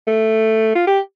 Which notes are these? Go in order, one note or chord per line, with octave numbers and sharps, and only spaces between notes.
A3
F4
G4